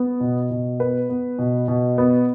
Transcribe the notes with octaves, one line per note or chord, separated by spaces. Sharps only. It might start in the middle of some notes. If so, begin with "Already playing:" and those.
Already playing: B3
B2
B2
B3 B4
B3
B2
B2
B3